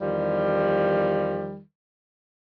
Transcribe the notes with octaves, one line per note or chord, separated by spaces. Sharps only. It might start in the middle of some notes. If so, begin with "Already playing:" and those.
E2 D#3 F3 G3